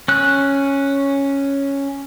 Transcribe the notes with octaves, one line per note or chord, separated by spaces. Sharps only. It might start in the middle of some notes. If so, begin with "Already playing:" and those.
C#4 F#6